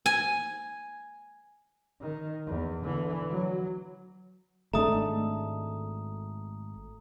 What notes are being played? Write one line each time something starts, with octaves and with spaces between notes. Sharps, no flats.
G#5
D#3
E2
D3 E3
F#3
G#1 G#3 A3 D4 A#5 D#6